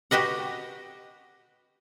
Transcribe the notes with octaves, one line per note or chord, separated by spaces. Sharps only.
F#4 G4 B4 D#5 F#5